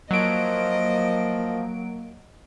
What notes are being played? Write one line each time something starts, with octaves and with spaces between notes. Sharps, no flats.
F3 F#3 A#3 D#5 D7